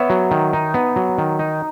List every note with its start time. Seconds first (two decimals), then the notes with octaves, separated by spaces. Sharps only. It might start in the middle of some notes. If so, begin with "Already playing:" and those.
Already playing: B3 C#5 E5
0.10 F#3
0.31 D#3
0.53 D#4
0.74 B3
0.96 F#3
1.18 D#3
1.39 D#4